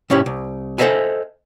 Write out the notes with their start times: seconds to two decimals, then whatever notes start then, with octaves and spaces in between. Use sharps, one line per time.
0.10 G#2 C3 C#4 E4 G4
0.26 C2
0.78 A4 C5 C#5 D#5 E5 G#5